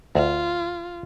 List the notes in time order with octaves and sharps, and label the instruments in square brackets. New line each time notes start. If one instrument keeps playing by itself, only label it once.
[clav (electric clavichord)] D2 [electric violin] F4